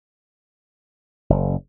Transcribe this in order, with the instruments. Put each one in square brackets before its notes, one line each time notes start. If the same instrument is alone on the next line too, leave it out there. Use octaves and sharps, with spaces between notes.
[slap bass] F#1